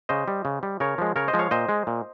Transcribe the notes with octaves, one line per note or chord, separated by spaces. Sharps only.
C#3 C5 D#5
G3
C#3
G3
C#3 A#4 C#5
F3 G#3
C#3 A#4 C#5
C5 D#5
F3 G#3
C#5 F5
A#2 C5 D#5
G#3
A#2